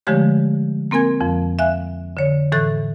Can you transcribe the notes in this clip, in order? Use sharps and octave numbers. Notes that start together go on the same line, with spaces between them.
D3 F3 G#3 A3 G4 C#5
A#3 C4 A#4 G#5 G#6
F2 F3
E5 F5 G#5 F#6
D3 C#5
A2 E3 A4 F#6